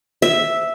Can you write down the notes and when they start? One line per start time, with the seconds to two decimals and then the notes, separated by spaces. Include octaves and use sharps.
0.22 E5